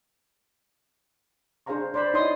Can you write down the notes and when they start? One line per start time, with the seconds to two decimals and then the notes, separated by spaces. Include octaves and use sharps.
1.66 D4 G#4 C5 F5 A#5 C#6
1.94 C5 D5 B5
2.14 D#4 E4 C#5 D5 C6 D#6